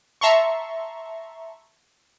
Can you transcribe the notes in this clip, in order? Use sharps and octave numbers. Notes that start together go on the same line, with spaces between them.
E5 A5 A#5 C6 C#6